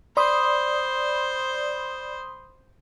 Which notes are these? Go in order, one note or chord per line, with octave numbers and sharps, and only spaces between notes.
C5 D5 B5 C6 D#6